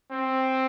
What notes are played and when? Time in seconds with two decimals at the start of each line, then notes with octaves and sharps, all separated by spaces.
0.11 C4